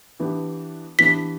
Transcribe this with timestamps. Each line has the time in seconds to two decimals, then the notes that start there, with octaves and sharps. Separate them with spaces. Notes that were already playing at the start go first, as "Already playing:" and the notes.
0.20 E3 B3 D4 G4
0.99 E3 B3 D4 G4 B6